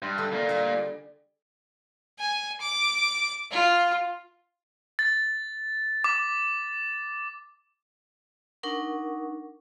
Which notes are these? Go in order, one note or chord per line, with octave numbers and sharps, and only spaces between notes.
G2 C6
D3 A3 E6
A#2 A#3 D5
G3 G#4
G#5
D6
F4
A6
D6
D4 D#4 A#4 F#5 C#6